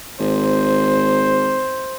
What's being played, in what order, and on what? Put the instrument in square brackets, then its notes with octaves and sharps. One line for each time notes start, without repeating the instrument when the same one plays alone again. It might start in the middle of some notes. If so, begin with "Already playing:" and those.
[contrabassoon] G#1 [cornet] C5